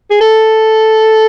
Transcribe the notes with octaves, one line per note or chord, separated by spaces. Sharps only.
G#4
A4